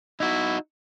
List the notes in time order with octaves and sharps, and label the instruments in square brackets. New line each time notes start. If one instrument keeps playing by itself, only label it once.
[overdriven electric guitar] D#4 F#4 [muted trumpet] E4